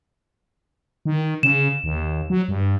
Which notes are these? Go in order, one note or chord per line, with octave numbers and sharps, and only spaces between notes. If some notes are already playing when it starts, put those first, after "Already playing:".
D#3
C#3 E7
D#2
F#3
G2